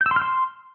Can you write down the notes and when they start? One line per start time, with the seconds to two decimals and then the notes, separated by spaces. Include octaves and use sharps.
0.01 G6
0.06 E6
0.11 C6
0.16 F6
0.22 C6